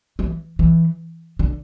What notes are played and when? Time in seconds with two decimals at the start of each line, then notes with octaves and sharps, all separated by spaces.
0.19 E3
0.59 E3
1.39 D3